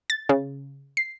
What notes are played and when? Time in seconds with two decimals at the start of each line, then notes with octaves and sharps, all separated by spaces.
0.10 A6
0.29 C#3
0.97 C7